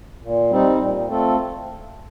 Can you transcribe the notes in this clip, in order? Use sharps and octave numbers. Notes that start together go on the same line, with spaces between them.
A#2
G3 C4 D#4
A#2
A3 C4 F4 A4